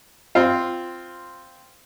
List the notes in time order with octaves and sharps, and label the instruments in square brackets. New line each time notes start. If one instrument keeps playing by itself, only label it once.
[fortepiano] C4 F4